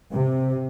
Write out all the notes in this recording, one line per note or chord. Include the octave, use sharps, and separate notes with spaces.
C3